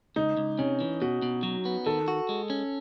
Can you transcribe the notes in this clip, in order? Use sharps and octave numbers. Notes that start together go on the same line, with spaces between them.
C#2 D#4
C#2
C3 C#4
E3
B2 F#4
B2
F#3
B3
D#3 A4
F#4
G#3
C#4